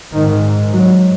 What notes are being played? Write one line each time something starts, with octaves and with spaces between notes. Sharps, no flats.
G#2 D#3
F#3